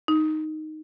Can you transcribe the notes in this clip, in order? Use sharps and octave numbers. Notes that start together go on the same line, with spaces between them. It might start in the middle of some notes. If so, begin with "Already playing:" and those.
D#4